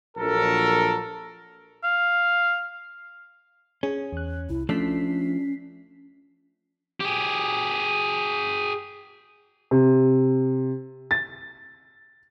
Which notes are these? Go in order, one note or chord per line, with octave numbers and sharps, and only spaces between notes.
A#1 F#3 A4 A#4
F5
C#4 G#4
E2 F#6
C2 E4
F3 A3 C#4 D4 B6 C7
G4 G#4
C3
A6